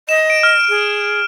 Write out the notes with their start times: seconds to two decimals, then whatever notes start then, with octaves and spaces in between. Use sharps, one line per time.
0.09 D#5 E7
0.30 D7
0.43 F6
0.69 G#4